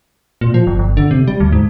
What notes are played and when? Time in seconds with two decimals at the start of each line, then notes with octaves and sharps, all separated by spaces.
0.41 A#2
0.54 F3
0.67 G1
0.79 G1
0.97 D3
1.11 C3
1.28 G3
1.40 D2
1.52 G#2